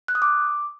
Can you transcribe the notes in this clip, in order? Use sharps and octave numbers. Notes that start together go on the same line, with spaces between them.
F#6
D#6
D6